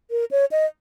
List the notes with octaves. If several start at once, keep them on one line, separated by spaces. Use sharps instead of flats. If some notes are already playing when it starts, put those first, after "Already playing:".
A#4
C#5
D#5